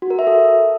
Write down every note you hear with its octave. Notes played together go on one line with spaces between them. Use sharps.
F#4
A#4
E5
A4